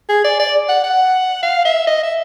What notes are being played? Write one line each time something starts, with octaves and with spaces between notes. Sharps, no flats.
G#4
D5
D5
F#5
F#5
F5
E5
D#5
E5